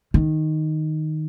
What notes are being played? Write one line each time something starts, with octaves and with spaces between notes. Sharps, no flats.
D#3